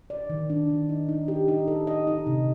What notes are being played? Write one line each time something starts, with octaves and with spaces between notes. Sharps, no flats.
D5
D#3
D4
D#3
D#4
D#4
G4
D#4
A4
D#5
D#4
C3